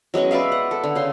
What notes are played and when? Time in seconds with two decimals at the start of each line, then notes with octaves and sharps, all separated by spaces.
0.14 F#3 G#3 B3 C#4
0.31 B4 D5 E5 F5
0.52 F#5
0.71 A4
0.84 D3
0.95 C#3 C6